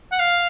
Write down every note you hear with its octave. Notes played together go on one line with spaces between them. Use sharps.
F#5
F5